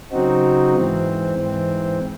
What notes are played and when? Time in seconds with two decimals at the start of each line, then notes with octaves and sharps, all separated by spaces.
0.12 C#3 F#3 C4 D#4 F#4
0.75 G#2 E3 C4
1.37 G#2 E3 C4